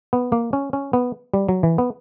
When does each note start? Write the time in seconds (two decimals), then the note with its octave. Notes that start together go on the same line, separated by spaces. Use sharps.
0.13 B3
0.32 A#3
0.53 C#4
0.73 C#4
0.93 B3
1.34 G3
1.49 F#3
1.63 E3
1.78 B3